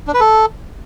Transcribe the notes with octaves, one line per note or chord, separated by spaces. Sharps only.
D4
B4
A4